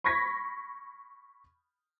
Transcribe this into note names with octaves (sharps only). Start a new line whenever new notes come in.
B5 C#6 G#6 A#6 B6